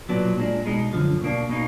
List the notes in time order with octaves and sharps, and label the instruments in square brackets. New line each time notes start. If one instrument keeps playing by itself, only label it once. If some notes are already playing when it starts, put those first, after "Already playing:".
[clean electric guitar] B1 A#2 F#3 B3 D4
A#2 G#3 D4
B2 G#3 D#4
F#2 D3 F3
B2 A#3 D4
B2 A#3 D#4